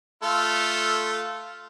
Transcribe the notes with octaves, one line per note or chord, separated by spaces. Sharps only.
A3 F4 A4